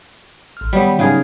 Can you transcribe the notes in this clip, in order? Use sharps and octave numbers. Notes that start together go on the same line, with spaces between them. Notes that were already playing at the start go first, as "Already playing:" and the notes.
A1 F6
D#3 G3 B3 C#5 E5
C#3 F#3 G3 D#4 G#4 A#4